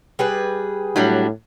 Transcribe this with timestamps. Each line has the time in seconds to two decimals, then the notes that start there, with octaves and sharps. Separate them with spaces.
0.19 G3 G#4 B4
0.96 A2 F#3 G3 D4